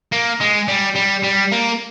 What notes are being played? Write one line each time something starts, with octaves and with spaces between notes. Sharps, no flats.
A#3
G#3
G3
G3
G3
A#3